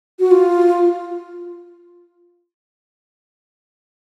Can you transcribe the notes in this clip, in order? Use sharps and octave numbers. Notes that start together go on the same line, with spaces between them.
F#4
F4